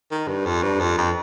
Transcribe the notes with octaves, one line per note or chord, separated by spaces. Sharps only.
D#3
G2
F2
G2
F2
F2